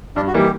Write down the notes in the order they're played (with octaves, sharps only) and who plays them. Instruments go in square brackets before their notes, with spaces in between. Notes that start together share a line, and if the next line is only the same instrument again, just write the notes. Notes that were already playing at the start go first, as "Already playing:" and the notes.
[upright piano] G2 [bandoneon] D4
[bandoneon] F#4
[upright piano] E3 G3 A#3 D#4 [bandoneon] G4